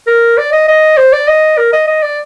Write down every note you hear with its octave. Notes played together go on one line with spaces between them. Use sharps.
A#4
D5
D#5
D#5
C5
D5
D#5
A#4
D#5
D#5
D5